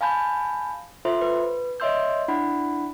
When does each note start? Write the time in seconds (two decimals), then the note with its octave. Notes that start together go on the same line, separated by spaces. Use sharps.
0.01 F5 G#5 A5 B5 G6
1.05 F4 A4 C5 E5 C6
1.21 B4
1.80 C#5 D#5 E5 C6 E6 G6
2.28 D4 E4 F#5 B5